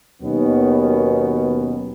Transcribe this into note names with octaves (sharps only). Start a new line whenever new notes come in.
D#2 B2 D#3 F#3 B3 C#4